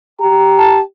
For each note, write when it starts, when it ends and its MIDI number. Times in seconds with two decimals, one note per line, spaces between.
0.20 0.81 67
0.20 0.78 82
0.58 0.79 81